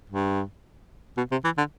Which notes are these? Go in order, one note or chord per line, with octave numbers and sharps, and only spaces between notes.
G2
B2
C3
E3
D3